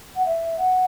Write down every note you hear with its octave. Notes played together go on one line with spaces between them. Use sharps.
F#5
E5
F#5